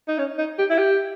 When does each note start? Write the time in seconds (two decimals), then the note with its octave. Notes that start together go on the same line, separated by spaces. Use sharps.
0.08 D#4
0.18 C#4
0.38 D#4
0.58 G4
0.70 E4
0.78 G4